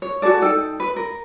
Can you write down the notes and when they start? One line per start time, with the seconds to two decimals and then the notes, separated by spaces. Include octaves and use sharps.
0.02 C#5
0.22 F#4 G#4 A4 D5
0.42 D#4 A4 G5
0.80 B4
0.96 A#4